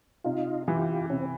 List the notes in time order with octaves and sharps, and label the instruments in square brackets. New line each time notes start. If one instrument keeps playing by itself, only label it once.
[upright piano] C3 [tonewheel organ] D#4 F4
[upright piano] E3 [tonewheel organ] F4 G4
[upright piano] C3 [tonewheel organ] C#4
[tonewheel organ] C4